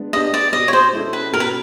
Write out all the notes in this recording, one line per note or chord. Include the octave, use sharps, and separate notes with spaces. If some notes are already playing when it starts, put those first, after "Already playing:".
Already playing: G#3 B3 D4
B3 D4 G4 D#5
D5
B2 D#5
C#5
C5
G#3 C#4 E4 A4
B4
B2 A#4
B4